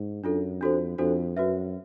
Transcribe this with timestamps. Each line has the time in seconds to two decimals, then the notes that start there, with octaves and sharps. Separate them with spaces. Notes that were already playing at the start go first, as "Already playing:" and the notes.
Already playing: G#2
0.23 F#2 D4 F4 A4
0.61 F2 D4 F#4 A4 C5
0.98 F2 D4 F#4 A4 C5
1.36 F#2 F#4 B4 E5